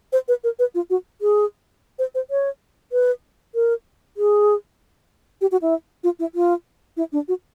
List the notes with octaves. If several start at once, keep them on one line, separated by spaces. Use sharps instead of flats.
C5
B4
A#4
B4
F4
F#4
G#4
C5
C5
C#5
B4
A#4
G#4
G4
F#4
E4
F4
E4
F4
E4
D4
F#4